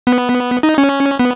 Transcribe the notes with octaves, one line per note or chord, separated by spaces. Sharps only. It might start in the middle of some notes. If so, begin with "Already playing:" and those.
B3
D#4
C#4
B3